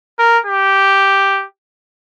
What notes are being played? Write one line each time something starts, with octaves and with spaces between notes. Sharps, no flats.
A#4
G4